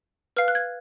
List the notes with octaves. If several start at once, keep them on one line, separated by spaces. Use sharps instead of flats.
B4 F5 F6
F#6
G#6